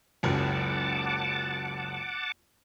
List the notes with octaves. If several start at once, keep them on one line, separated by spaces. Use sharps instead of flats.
F#1 C#2 F#2 F#5 A5 D6